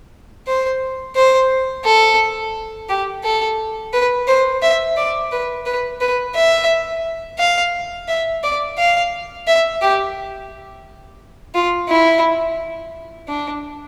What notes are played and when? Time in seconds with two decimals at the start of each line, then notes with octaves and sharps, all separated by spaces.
0.47 C5
1.16 C5
1.85 A4
2.89 G4
3.24 A4
3.93 B4
4.28 C5
4.62 E5
4.97 D5
5.32 B4
5.66 B4
6.01 B4
6.36 E5
7.39 F5
8.08 E5
8.43 D5
8.78 F5
9.47 E5
9.82 G4
11.55 F4
11.89 E4
13.28 D4